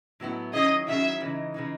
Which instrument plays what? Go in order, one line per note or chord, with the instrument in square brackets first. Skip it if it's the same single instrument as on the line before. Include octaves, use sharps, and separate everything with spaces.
[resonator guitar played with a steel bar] A2 F#3 B3 E4
[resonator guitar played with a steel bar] D#3 F#3 C#4 E4 G#4 [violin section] D#5
[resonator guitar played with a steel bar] D#3 F#3 C#4 E4 G#4 [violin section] E5
[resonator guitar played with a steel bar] C#3 E3 G#3 D#4
C#3 E3 G#3 D#4